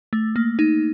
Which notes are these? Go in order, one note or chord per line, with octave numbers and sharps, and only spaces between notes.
A3
A#3
D#4